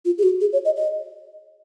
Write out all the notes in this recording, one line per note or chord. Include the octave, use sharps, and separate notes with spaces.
F4
G#4
F#4
G#4
C#5
D#5
D#5